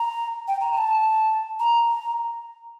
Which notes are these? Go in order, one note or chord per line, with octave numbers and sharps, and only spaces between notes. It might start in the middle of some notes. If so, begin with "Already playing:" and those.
Already playing: A#5
G5
A#5
A#5
A5
A#5